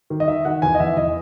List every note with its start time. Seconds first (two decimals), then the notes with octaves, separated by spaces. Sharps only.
0.10 D#3
0.20 D#5
0.28 D#3 E5
0.45 D#3 F#5
0.62 E2 G#5
0.75 D#5
0.80 E2 E5
0.97 E2 D#5